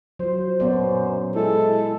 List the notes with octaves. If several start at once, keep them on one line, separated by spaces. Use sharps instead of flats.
F#3 F4 C5
F#2 A#2 B3 D5
G#3 E4 A4